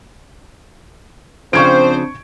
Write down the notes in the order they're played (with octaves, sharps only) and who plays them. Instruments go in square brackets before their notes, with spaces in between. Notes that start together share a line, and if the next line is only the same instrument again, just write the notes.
[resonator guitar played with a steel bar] C#3 F3 [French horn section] C4 D4 [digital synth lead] C5 [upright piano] C#6 G#6 D7